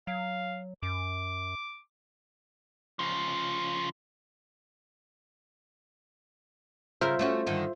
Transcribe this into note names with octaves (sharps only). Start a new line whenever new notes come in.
F#3 F5
F#2 D6
C#3 F3
C#3 F4 A#4 C5 E5
A3 C#4 F#4
G2 D3 D#3